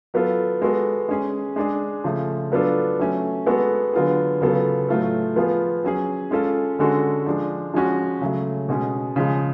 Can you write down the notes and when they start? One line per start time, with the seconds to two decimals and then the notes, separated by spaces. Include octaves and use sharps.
0.14 F#3 B3 F4 A4
0.62 G#3 B3 F#4 A4
1.09 G#3 C#4 G#4
1.56 G#3 D4 G#4
2.04 C#3 F3 A3
2.52 F#3 B3 D4 F4 A4
2.99 F#3 A3 C#4
3.46 G#3 B3 F#4 A4
3.93 D3 F#3 B3 F4 G#4
4.41 C#3 F#3 B3 F4 A4
4.89 A2 F#3 A3 F4 A4
5.36 F3 B3 F4 G#4
5.84 F#3 C#4 G#4
6.31 G#3 C#4 F4 A4
6.79 D3 G#3 C#4 F#4 A4
7.26 F3 G#3 D4
7.74 F3 G#3 C#4 F#4
8.21 C#3 F#3 A3
8.69 B2 G#3 C#4
9.16 C#3 F3 G#3